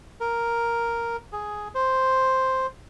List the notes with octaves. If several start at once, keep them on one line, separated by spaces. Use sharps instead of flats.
A#4
G#4
C5